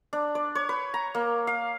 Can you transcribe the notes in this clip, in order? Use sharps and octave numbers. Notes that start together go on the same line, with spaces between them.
D4
D5
C#5
B4
A#5
A#3
F5